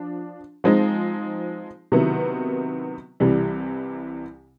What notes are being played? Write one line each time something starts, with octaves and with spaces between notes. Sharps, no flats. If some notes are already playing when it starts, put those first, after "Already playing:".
Already playing: F3 D4
F3 G#3 C4 D#4
C3 D#3 F#3 B3 E4
C2 C3 E3 G3